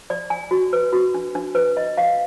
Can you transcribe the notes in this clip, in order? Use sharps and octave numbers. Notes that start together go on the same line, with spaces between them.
D5
G#5
F#4
B4
F#4
D4
D4
B4
D#5
F5